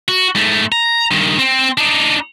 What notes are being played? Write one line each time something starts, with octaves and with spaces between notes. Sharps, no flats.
F#4
G#2 A3
A#5
G2 D#3
C4
D4 D#4